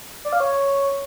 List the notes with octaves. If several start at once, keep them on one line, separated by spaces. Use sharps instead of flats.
D5
F5
C#5